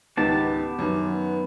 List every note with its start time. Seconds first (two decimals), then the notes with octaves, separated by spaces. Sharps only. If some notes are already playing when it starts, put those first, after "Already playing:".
0.17 C#2 G#2 D#3 B3 G4 A5
0.79 F#2 D#3